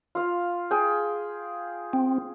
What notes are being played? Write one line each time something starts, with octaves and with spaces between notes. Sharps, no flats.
F4 F5
G#4 G5
C4